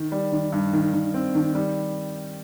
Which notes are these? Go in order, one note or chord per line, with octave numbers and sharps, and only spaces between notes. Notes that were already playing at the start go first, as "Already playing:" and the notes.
Already playing: D#3
G3
D#3
G2
D#3
D#3
C4
D#3
G3